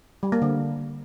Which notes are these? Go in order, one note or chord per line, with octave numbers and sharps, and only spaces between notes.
G3
A#3
D3